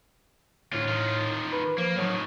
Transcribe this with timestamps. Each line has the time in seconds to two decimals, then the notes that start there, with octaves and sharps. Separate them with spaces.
0.73 D2 A2 F4
0.88 D#3 F4
1.52 B4
1.78 F3 A#3
1.96 A2 D#3 F#3